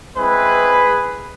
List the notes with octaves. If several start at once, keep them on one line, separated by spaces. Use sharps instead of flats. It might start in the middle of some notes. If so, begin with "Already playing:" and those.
G#3 C4 E4 G#4 B4